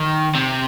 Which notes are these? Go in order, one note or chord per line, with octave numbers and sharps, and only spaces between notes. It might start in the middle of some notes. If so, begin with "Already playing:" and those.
Already playing: D#3
C3